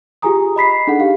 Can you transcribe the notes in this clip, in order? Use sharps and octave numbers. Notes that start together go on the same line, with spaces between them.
F4 G4 G#4 G#5 A#5 D#6
D#5 B5 B6 C7
D4 D#4 G#4 A4 F#5
G4 F5